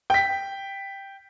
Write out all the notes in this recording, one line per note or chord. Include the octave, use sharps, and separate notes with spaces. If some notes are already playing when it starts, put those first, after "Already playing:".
G5 B6